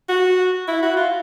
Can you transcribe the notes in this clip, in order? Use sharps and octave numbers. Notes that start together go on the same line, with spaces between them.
F#4
E4
F#4
F4